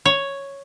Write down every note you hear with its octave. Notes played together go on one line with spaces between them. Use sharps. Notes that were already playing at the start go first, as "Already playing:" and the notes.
C#5